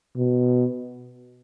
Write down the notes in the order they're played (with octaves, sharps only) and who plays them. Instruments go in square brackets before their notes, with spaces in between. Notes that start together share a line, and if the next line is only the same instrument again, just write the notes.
[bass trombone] B2